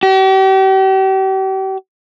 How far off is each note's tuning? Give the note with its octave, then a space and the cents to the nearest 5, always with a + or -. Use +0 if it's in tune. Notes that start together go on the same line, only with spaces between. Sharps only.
G4 -40